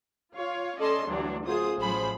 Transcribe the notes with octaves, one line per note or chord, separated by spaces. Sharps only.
F4 C#5 F5
C#4 A4 D5 D#5 A5 C6
D2 G2 E3 F#3 D4
F#2 F4 G#4 C5 D#6
A1 F3 F#3 G#4 C5 B5